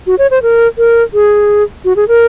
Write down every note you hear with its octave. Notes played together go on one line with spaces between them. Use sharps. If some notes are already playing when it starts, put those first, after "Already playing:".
F#4
C#5
C5
A#4
A#4
G#4
F#4
G#4
A#4